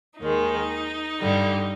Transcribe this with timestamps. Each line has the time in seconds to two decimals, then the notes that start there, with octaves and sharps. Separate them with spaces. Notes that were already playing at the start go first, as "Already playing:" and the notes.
0.20 D#2 D#3 G#3 D#4
1.19 G2 D3 G3